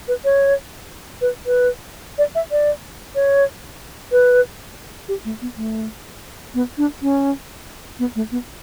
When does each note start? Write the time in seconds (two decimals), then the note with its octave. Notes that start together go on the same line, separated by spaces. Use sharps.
0.08 B4
0.25 C#5
1.21 B4
1.46 B4
2.18 D5
2.35 E5
2.51 D5
3.15 C#5
4.12 B4
5.08 G4
5.25 A3
5.41 B3
5.57 A3
6.54 B3
6.78 D4
7.02 C#4
7.99 B3
8.16 A3
8.32 B3